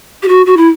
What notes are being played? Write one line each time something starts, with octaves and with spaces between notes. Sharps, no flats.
G4
F#4
F#4
E4